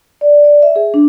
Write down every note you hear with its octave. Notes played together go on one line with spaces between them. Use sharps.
D5
D5
E5
G#4
D4